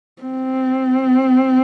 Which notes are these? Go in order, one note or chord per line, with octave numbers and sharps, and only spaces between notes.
C4